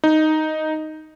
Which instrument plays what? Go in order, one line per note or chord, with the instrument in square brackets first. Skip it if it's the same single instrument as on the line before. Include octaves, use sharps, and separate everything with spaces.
[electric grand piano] D#4